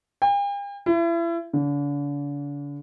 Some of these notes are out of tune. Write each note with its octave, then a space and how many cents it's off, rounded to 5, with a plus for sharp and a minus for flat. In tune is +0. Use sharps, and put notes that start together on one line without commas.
G5 +45
E4 +35
D3 -40